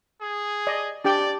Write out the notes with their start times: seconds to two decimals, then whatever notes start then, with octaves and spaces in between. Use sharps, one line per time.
0.21 G#4
0.67 D5 D#5
1.05 D4 G4 D5 G5